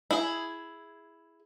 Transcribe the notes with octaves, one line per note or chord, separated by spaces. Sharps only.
E4 G#4